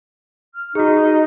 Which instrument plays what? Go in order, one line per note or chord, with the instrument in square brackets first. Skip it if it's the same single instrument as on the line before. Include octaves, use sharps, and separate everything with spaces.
[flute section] F6
[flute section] D#4 D#5 [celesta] F#4 G#4